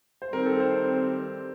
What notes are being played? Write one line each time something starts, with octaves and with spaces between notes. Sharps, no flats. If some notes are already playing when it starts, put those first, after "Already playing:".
C5
D#3 G3 C4 A#4
A4
C5